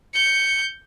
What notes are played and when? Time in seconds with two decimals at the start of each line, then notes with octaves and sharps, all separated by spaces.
0.14 G6 C#7